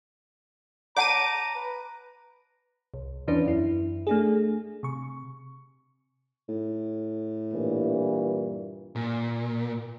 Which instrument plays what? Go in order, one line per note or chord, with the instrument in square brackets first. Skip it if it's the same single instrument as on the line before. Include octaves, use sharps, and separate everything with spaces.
[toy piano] C#5 F#5 A5 [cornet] A#5 [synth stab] D6 D#7
[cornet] B4
[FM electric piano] C2
E2 E3 C#4 D4 B4
F#2 E4
A3 D4 G#4
C3 C#6
[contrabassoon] A2
[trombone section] G2 A#2 E3
[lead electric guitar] A#2